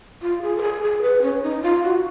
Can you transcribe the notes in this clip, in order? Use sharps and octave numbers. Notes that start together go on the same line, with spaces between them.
F4
G#4
A#4
G#4
G#4
B4
C#4
D#4
F4
F#4